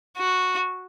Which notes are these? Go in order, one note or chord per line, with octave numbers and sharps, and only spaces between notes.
F#4